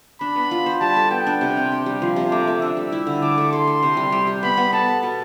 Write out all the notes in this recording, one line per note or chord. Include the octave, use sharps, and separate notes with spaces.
D4 B5
B3
F4
C5
G3 A5
A4
B3 G5
D4
C3
C4
G4
G3
F3 C6
C3
A3 D6
A3
D4 E6
G3
E4
D3
A3 D6
A3
A4 C6
A4
C3
G3
G3
G4
B3 B5
B3
A4 A5
A4
B2